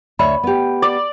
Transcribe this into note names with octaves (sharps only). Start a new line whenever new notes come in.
D2 C#5 E5 B5
B3 G4
D5